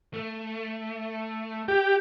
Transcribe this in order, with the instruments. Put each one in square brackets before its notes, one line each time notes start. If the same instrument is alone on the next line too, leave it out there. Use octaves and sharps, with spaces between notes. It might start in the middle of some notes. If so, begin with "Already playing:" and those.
[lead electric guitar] A3
[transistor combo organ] G4